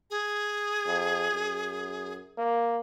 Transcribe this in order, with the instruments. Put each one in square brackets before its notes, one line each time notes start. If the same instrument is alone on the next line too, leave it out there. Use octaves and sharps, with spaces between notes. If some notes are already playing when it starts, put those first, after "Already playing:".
[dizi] G#4
[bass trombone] F2
F#2
A#3